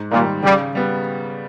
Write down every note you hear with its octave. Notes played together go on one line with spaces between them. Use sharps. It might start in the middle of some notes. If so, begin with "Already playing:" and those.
Already playing: G#2
A#2 D#3 G3
C#3 G3
G3 B3